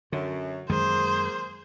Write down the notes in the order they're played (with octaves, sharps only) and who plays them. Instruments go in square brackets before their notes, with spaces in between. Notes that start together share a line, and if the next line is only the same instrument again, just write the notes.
[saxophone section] F#2 [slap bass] D3
[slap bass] F#2 D#3 G#3 [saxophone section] A#3 G#4 [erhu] C5